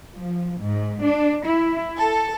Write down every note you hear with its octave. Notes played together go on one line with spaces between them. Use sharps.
F3
G#2
D4
E4
A4